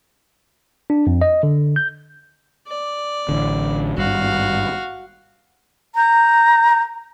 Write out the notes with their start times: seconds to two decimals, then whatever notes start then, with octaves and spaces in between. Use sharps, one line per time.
0.90 D4
1.07 F2
1.22 D#5
1.43 D3
1.76 G6
2.67 D5
3.29 A1 D3
3.98 G#1 G2 F#4 F5
5.96 A#5 G6